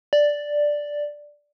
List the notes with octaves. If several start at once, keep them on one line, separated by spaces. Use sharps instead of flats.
D5